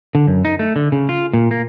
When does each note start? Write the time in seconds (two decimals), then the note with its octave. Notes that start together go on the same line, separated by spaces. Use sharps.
0.15 D3
0.27 F#2
0.45 D#4
0.59 A3
0.76 D3
0.92 C#3
1.09 F4
1.33 A#2
1.51 A#3